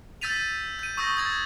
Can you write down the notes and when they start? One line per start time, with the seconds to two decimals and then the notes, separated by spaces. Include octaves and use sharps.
0.21 E6 G6 A6 B6 D#7 F7
0.79 G6 D#7
0.97 C#6 D#6 E6 G6 A#6
1.17 D#6 G#6 A6